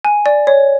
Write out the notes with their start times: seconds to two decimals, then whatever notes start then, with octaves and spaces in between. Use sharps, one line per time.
0.05 G#5
0.26 D5
0.47 C#5